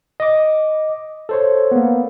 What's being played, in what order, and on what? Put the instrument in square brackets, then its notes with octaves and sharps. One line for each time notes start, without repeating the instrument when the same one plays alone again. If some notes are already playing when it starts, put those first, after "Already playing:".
[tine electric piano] D#5 D6
A4 C5 C#5
A#3 B3